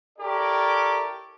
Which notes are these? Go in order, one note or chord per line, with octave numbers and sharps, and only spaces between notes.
E4 G4 A4 A#4 C#5 D5